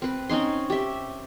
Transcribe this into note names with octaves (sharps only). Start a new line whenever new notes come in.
C4 B4
C4 C#4 D#4 C6
G4 E5